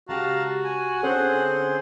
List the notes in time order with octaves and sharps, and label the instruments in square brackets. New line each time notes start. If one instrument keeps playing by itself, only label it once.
[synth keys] C#2 C#3 G4 [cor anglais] F#4 [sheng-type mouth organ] F5 A5 A#5
[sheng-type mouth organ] G#5
[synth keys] D3 C#4 A4 [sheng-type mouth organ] C4 G#4 C5 [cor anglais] F#5